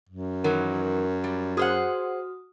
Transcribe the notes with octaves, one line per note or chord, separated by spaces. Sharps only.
F#2
D#3 E3 F#3 A#4
G3
F#4 G#4 C5 F#5 D#6 F6